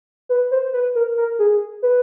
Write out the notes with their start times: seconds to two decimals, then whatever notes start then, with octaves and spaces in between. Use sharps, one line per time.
0.29 B4
0.51 C5
0.73 B4
0.95 A#4
1.17 A#4
1.39 G#4
1.82 B4